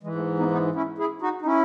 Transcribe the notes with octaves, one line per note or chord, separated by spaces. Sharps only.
G#2 E3 G#3
A3
B3 D#4
B3 D#4
C#4 E4
E4 G#4
D#4 F#4
D#4
C#4 E4